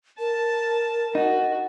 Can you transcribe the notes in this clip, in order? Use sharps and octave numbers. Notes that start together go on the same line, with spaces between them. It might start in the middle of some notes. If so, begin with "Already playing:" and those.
A#4 A5
D#4 F#4